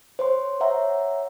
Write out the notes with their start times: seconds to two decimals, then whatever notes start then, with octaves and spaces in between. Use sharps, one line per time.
0.19 C5 C#5 C6
0.61 C#5 E5 F#5 A#5